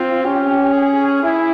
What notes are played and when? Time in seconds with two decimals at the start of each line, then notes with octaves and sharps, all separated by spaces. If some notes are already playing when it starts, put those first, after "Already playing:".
Already playing: C4 F4
0.24 C#4 G4
0.73 G#4
1.23 E4 G#4